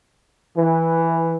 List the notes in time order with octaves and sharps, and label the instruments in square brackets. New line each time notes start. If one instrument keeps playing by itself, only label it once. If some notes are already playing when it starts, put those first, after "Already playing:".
[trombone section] E3